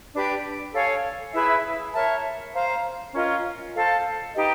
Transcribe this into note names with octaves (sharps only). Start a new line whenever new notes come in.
D4 G4 B4
A4 C#5 F5 G#5
E4 G#4 B4 E5
A#4 C#5 E5 A5
C5 F5 A#5
C#4 F4 A#4 D#5
A4 C5 F5 A5
D#4 G4 B4 D#5